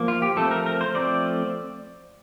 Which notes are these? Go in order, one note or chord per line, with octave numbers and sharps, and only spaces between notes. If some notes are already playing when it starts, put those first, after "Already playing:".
Already playing: F3 A#3
F4
G4
F3 A3 C4 A4
A#4
A#4
C5
F3 A3 C4 D5